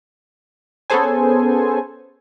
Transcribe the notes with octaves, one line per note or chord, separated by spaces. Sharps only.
B3 C#4 G#4 A4 C5 G#5